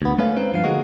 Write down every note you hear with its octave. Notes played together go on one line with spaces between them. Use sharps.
D2 B3
G#3 A3 C#4 B4 F5
C4 D#4 B4
G2 F3 F5
D3 G#3 A#3 D#4 F#4